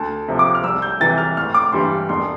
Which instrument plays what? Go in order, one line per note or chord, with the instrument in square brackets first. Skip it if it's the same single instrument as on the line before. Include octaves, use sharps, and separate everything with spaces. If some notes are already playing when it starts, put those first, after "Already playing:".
Already playing: [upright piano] D2 A5
C3 F3
D6
F6
C2 E6
G6
C3 E3 A6
F6
A1 F6
D6
G2 E3 G3 C6
E1 C6